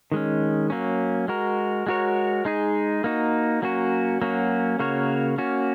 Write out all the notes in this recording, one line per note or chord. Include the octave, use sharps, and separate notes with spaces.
D#3 G#3 C#4
F#3 A#3 C#4
G#3 F#4 A#4
G#3 F#4 A#4 C#5
G#3 D#4 G#4
A#3 D#4 F#4
F#3 A#3 C#4 F#4
F#3 A#3 C#4 F#4
C#3 A#3 F#4 A#4 C#5
A#3 C#4 F#4